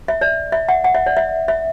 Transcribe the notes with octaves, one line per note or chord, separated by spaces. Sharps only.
E5
D5
E5
F#5
F#5
E5
D5
E5
E5